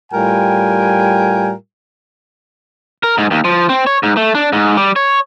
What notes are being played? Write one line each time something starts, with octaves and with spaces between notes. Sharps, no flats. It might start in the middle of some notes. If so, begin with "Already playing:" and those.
A2 G3 F4 A#4 G5 G#5
A#4
G#2
D#2
F3
C4
C#5
G#2
A3
D4
G#2
G3
C#5